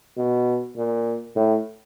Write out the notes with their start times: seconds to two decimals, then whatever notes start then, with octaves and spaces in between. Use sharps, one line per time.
0.17 B2
0.77 A#2
1.35 A2